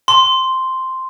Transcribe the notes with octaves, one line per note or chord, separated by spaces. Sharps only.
C6